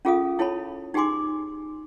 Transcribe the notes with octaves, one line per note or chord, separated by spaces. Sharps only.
C#4 F4 G#4 A4 F5 D#6
E4 A4 C#5 A5 B5
D#4 G4 G#4 G#5 C6 D6